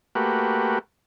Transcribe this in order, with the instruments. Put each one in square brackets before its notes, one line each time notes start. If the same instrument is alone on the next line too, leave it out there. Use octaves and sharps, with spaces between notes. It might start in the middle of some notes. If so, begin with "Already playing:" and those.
[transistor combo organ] A3 A#3 F#4 G4 B4